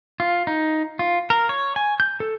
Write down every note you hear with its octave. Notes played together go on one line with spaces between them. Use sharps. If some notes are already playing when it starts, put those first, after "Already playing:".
F4
D#4
F4
A#4
C#5
G#5
G6
A4